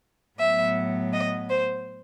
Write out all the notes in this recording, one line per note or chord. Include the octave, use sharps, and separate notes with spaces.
A2 F#3 B3 E5
D#5
C5